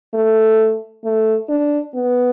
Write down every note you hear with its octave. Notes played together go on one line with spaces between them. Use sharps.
A3
A3
D4
B3